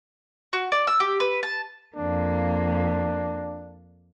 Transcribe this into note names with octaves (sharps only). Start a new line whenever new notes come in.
F#4
D5
E6
G4
B4
A5
F2 A#3 D4